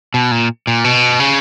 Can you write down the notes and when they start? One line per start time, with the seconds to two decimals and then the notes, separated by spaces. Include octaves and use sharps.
0.14 B2
0.31 A#2
0.67 A#2
0.84 B2
1.20 C#3